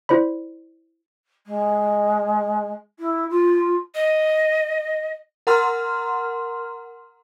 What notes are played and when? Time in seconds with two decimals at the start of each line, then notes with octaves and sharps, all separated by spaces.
0.09 E4 C5 D5 B5
1.47 G#3
3.00 E4
3.30 F4
3.94 D#5
5.47 A#4 F#5 A#5 C6 F6